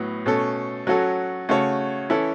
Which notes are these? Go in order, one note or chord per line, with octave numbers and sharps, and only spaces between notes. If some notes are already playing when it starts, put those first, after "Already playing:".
Already playing: A2 F#3 B3
B2 A3 C#4 A4
F#3 C#4 F#4 A4
C#3 A3 F#4 A4 C#5
E3 C#4 E4 A4